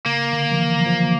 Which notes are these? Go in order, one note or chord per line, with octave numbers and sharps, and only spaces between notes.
C#3 A#3
D3
F3
E3
F#3
F3